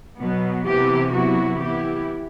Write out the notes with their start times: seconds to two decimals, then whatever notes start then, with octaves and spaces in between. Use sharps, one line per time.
0.20 B2 F#3 B3
0.66 C3 E3 B3 E4 G4
1.13 C3 F#3 B3 E4 F#4
1.59 E3 B3 E4 G4